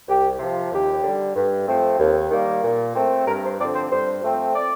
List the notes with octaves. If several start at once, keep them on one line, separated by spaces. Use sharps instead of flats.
C2 G4
C3 F3
D#2 G4
D3 G3
G2
F3 A3 C4
D#2
D#3 G3 A#3
A#2
A3 C4
G2 A#4
C5
D3 F3 C4 D5
C5
G2 C5
F3 A3 C4
D5